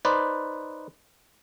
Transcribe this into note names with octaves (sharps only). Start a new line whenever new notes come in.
D#4 B4 C5 D5